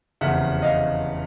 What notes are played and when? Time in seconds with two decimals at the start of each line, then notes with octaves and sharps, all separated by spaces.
0.21 F1 E2 C#3 E5 F#5
0.62 D#5 F5